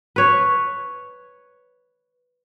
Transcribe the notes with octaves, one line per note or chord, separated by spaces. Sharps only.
B4 C#5